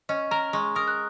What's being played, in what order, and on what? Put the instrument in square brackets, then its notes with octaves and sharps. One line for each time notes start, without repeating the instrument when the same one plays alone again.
[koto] C#4 [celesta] D#5
[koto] A#4 [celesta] A#5
[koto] G#3 [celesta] C#6
[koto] A#4 [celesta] D#6
[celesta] F#6